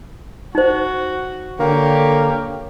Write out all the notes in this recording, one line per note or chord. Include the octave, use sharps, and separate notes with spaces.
D#4 F#4 C5
D3 A#3 G4 C#5